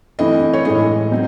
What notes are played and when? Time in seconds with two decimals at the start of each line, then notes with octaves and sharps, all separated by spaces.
0.19 E3 A3 C4 E4 D#5
0.53 C#5
0.65 A2 E3 G#3 D#5
1.11 F#3 C4 D#4